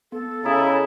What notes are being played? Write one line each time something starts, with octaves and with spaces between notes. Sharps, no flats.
B3 A4
C#3 E4 D#5 E5 A#5 D#6